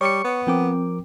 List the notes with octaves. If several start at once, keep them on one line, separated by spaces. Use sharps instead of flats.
G3 C#5 C#6 C#7
B3
F3 C4 A#4 G5 D6